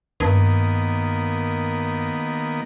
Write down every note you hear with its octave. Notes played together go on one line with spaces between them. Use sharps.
G2 D#3 A#3 B3